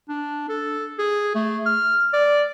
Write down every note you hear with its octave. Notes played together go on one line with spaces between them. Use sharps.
D4
A4
G#4
A3
F6
D5